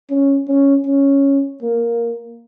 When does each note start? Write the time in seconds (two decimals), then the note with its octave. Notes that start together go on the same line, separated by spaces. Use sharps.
0.10 C#4
0.48 C#4
0.86 C#4
1.62 A#3